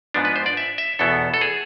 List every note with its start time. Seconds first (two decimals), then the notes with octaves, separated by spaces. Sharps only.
0.14 G#2 F3 B3 D4
0.25 B4
0.36 C5
0.46 D5
0.57 E5
0.78 E5
0.99 E2 B2 B3 E4 A4
1.34 A4
1.41 G#4